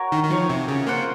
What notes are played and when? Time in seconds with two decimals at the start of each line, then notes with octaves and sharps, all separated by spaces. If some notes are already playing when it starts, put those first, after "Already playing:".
Already playing: F#4 A#4 C#5
0.12 D#3
0.23 D#3
0.30 F3 F#4 A#4 C#5
0.49 C3
0.68 C#3
0.87 A#3 C4 F4 C5 F#5